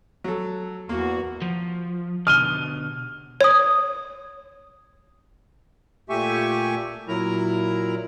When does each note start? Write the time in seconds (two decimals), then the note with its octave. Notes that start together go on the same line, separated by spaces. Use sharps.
0.24 F#3 A4
0.89 E2 A#3 F#4
1.42 F3
2.27 B2 D3 F6 D#7 G7
3.41 C#5 D#6
6.09 A#2 A3 G4 E5 G#5 C#6
7.08 A#2 F#3 E4 A#4 A#5